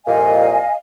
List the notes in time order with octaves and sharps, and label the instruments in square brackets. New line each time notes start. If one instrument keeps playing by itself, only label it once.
[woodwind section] C2 F2 A#2 [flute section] D#5 F5 G#5